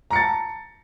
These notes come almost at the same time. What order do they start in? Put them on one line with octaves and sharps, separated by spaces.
A#5 C#7 A6 A5